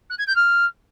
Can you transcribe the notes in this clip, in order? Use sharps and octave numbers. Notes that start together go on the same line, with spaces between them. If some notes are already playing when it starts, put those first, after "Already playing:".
F#6
G#6
G6
F6